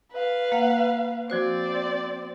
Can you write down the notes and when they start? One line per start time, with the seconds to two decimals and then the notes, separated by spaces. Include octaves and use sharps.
0.12 B4 F5
0.52 A#3 F#5
1.30 F3 C4 F#4 C5 D5